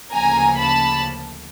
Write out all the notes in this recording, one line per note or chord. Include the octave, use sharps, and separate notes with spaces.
D2 C#3 F3 A#3 G#5 A#5
A5 B5